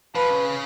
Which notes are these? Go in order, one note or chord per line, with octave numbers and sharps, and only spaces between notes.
F3 B4
C#3